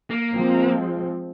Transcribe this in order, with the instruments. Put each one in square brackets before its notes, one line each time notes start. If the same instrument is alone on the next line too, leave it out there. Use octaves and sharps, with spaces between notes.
[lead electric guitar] A#3
[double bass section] F3 G#3 C4